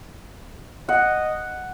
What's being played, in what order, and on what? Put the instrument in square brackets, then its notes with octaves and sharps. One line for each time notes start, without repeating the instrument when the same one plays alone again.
[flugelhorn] D#5 [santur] F#5